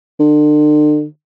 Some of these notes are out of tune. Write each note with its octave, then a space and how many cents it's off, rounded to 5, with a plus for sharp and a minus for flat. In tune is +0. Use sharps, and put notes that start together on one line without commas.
D3 +40